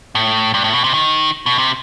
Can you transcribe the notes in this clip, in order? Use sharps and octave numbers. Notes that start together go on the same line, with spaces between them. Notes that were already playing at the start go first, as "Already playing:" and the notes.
A2
G2
A2
B2
C3
D#3
B2
C3